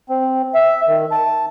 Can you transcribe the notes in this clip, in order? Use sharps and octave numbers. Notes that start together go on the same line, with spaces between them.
C4
E5
D#3
A5